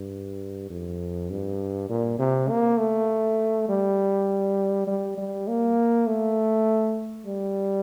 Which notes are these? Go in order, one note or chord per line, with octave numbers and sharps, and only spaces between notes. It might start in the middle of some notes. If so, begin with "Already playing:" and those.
Already playing: G2
F2
G2
A#2
C3
A#3
A3
G3
G3
G3
A#3
A3
G3